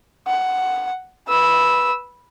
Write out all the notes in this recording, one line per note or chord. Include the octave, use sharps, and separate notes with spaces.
F#5
B4 E6